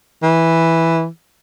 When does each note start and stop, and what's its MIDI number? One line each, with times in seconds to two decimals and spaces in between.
0.23 1.07 52